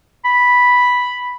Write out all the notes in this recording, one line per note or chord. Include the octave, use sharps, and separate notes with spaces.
B5